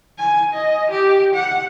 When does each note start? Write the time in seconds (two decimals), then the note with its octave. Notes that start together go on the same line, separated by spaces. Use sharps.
0.19 G#5
0.54 D#5
0.91 G4
1.34 F#5